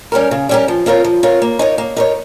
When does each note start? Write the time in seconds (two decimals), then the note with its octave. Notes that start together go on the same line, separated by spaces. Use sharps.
0.12 G3 C#4 G4 A#4
0.31 C#3
0.49 G3 C#4 G4 A#4
0.68 F3
0.86 C4 F4 A#4 C#5
1.04 F3
1.23 C4 F4 A#4 C#5
1.42 A#3
1.59 D#4 A#4 C#5
1.78 A#3
1.97 D#4 A#4 C#5